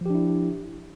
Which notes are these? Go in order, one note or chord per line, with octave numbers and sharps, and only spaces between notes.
F3 D4 E4 G4